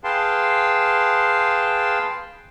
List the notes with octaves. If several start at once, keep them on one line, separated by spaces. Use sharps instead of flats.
G#4 B4 F5 G5 A5 C6